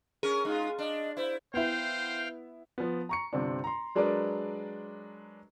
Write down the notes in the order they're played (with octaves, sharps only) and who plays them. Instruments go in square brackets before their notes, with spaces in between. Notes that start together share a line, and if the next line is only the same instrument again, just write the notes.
[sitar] C#4 A#4 [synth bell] G#4
[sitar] G#3 F4 [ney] D#4
[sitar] D4 [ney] D#5
[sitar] E4 [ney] C5
[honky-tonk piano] B3 E4 [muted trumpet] C5 [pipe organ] F5 G5 F6
[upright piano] F3 B3
A#5 C#6 C#7
G1 C3 C4 D4
A#5 C6
F#3 G#3 D4 A#4 B4 D5